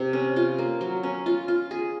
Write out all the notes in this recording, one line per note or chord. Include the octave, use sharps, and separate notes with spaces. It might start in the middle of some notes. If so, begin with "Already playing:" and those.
Already playing: C3
C#4
F4
A#3
F#3
C#4
F4
F4
G#4